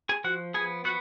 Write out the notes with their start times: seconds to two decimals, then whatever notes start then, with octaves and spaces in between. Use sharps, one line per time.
0.09 G#4 G#5
0.24 F3 F#4 F#5
0.54 B3 G#4 G#5
0.85 B3 F#4 F#5